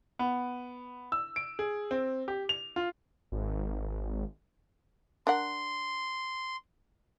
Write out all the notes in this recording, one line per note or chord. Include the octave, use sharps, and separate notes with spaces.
B3
E6
D7
G#4
C4
G4
F7
F4
G#1
D4 A#4 F#5 C6